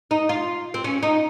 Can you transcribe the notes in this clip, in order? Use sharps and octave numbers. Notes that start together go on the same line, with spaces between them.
D#4
F4
C4
C#4
D#4